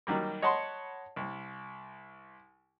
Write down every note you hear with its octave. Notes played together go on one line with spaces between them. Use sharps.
D#3 F#3 G3 A#3
C#5 D#5 F#5 A5 B5 C6
C2